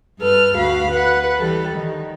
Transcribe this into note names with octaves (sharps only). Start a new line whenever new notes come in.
G2 A4 B4 F6
D2 F#4 F5 B5
B4 F#5
E3 G3 A4
D#3